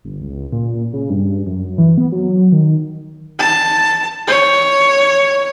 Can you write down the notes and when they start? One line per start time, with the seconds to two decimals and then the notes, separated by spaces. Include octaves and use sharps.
0.05 G1
0.21 C#2
0.52 A#2
0.93 C#3
1.10 G2
1.47 F#2
1.78 E3
1.98 B3
2.12 F#3
2.52 D#3
3.40 A5
4.27 C#5